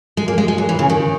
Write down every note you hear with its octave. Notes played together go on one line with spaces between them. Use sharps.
G#3
A#3
G#3
G#3
F#3
E3
C#3
D#3